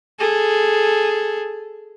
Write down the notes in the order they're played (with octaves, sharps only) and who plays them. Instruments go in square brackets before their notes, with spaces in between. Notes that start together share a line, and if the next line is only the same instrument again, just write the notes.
[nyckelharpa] G#4 A4